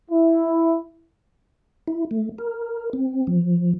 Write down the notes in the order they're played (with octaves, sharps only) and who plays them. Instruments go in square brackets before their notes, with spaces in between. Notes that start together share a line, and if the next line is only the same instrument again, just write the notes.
[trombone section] E4
[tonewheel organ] E4
A3
A#4
C4
F3